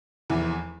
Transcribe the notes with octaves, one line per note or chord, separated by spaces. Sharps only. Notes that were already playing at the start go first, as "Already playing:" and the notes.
F1 E2 E3